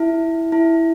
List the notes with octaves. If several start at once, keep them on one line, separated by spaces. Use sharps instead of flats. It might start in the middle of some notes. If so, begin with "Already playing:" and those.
Already playing: E4
E4